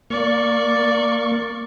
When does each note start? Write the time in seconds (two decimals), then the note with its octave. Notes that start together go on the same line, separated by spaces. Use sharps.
0.10 A#3 D5 C#6